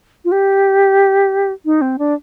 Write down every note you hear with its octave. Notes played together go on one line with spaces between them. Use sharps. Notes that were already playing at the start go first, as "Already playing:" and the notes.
F4
G4
D#4
C4
D4